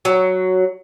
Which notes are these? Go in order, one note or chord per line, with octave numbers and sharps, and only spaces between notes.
F#3